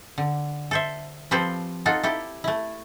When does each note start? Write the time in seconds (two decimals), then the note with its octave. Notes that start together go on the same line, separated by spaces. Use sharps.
0.18 D3
0.71 A4 C5 E5
1.31 F3 C4 G4 A4 B4 C5
1.86 D#4 F4 A4 F#5
2.03 E4 G4 A4
2.44 A3 E4